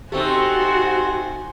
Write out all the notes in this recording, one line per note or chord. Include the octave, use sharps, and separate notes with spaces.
A3 C4 D#4 F#4 G4 C5 G#5